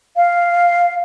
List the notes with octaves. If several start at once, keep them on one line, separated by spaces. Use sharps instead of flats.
F5